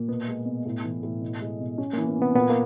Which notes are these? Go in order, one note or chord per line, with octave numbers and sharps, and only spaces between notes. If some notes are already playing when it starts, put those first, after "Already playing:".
Already playing: A#2 A#3
B2 B3
G#3
B2
A2
E3
A2
B2
G#3
B2
C#4
E3 A#3
B3
C3 B3
A#2 B3
A#3